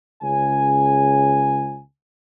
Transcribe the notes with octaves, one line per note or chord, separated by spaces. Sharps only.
C#2 C#3 G#5